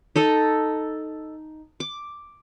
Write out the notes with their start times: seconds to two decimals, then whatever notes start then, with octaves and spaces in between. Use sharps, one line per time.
0.16 D#4 A4 D#5
1.80 D6